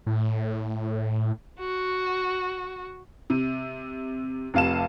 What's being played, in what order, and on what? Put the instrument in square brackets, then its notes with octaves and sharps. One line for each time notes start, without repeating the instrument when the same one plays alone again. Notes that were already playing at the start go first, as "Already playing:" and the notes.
[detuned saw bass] A2
[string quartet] F#4
[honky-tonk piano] C3
F1 C3 F5 A5 E7